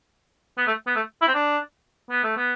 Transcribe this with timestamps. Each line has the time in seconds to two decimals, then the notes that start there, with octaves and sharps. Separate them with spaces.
0.58 B3
0.67 A3
0.87 B3
0.96 A3
1.22 E4
1.28 C4
1.35 D4
2.11 B3
2.24 A3
2.37 B3